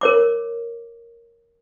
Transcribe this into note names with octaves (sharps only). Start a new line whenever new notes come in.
A#4 C#5 D6